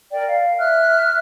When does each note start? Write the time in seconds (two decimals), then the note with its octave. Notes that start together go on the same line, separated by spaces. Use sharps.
0.12 A#4 D5 G5
0.27 F5
0.58 E5 F6 F#6